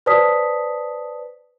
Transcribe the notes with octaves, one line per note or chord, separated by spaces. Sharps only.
B4 C5 D5 A5 D#6 B6